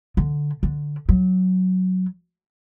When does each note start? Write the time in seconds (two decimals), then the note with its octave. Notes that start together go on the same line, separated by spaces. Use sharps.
0.17 D3
0.63 D3
1.09 F#3